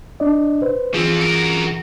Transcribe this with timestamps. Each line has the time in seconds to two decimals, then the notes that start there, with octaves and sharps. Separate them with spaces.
0.20 D4 D5 D#5
0.62 B4 C5
0.95 E3 F3 C4 F4 G#4
1.21 F#4 A#4